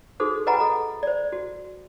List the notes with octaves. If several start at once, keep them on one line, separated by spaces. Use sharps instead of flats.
D#4 F#4 G#4 A4 C5
B4 D#5 F#5 G#5 A#5 B5
A4
C5 D5
F#4